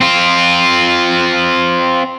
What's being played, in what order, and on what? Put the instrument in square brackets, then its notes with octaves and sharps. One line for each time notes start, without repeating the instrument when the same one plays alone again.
[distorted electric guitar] C4 F4